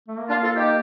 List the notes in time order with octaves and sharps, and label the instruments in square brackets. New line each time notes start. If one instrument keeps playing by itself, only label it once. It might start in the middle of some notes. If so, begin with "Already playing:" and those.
[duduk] A3
A#3
[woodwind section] D4 F4
F4 A4
D#4 G4